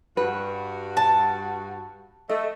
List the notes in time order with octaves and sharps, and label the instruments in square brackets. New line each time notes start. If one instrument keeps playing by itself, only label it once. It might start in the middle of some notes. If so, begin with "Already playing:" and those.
[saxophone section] G2 F#4 [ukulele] B4
[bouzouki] A5
[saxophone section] A3 [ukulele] D#5